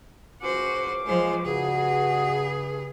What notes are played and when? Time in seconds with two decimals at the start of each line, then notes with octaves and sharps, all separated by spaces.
0.42 C#2 C#4 F#4 C5 D6
1.07 F3 G#3 C5
1.45 G2 C#3 F#4 G#4